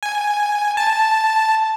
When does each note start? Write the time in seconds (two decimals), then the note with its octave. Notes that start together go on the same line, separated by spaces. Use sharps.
0.03 G#5
0.77 A5